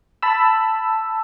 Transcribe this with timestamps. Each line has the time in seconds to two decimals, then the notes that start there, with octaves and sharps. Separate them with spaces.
0.22 A5 B5 E6